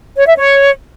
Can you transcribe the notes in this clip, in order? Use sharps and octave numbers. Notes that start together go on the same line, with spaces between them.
C#5
E5
C#5